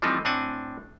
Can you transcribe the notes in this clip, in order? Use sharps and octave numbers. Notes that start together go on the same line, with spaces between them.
E3 F3 G3 A3 C4 D#4
A2 C4 D4 F#5 G#5